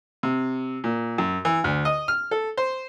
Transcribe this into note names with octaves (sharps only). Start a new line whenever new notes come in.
C3
A#2
F#2
E3
D2
D#5
F6
A4
C5